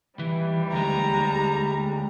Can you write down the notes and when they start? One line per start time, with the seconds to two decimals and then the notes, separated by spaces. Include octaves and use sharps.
0.19 D#2 E3 G3
0.72 D2 G#3 A#5